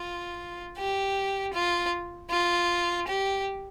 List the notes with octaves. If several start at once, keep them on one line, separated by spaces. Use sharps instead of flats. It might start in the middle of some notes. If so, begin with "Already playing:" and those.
Already playing: F4
G4
F4
F4
G4